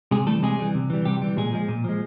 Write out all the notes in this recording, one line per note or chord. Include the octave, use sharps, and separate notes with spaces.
C3 G#3 G#4
E3 G3 A3 A4
C3 G#3 G#4
E3 G3
C3
E3 G3
C3 G3 G4
E3 G3
A#2 G#3 G#4
F3 G#3
A#2
F3 G#3